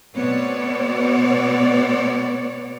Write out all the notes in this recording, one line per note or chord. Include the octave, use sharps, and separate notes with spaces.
B2 A3 B3 C4 C#5 D5